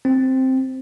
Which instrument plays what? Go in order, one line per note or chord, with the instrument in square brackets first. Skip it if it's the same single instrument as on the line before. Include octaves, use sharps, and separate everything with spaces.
[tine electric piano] C4